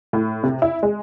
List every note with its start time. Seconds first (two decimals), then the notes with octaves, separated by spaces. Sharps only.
0.13 A2
0.44 C3
0.62 E4
0.83 G#3